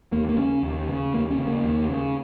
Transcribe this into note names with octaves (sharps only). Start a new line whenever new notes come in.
D#2 A#3
A#3
C#3 C#4
D#2
C#3
D#2 A#3
C#4
C#3
A#3
D#2
C#3